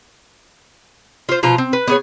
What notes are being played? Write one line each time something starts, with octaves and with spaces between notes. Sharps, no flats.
F4 C5
B2 F3 F4 A#5
C4
B4
B3 G#4 C#5